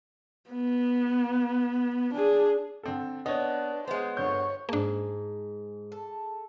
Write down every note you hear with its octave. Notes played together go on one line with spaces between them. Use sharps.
B3
D4 G#4
D3 C4 A4
B3 D4 C#5 D#5
G#3 B3 C5
G1 D3 C#5 G6
G#2 A#3 D4 G#4 A5
A4